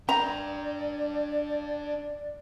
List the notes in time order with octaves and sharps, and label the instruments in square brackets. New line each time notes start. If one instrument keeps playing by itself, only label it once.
[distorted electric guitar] D4 G5 [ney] D5 [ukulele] A#5